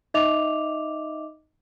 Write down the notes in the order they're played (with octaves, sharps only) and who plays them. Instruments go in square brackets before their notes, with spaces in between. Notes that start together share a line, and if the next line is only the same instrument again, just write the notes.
[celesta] D#4 D#5 E5 D6 F7